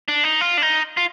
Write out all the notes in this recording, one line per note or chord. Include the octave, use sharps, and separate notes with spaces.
D4
D#4
F4
D4
D#4
F4